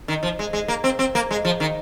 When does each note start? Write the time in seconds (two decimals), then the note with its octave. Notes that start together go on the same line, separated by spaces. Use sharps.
0.08 D#3
0.23 F3
0.39 G#3
0.53 G#3
0.68 A#3
0.84 C4
0.99 C4
1.15 A#3
1.31 G#3
1.45 F3
1.60 D#3